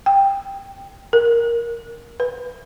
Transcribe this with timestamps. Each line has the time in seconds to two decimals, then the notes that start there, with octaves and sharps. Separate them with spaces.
0.06 G5
1.13 A#4
2.20 B4